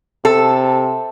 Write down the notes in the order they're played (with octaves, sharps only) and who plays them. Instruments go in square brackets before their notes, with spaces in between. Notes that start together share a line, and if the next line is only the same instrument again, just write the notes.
[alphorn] C3 [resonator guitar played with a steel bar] A4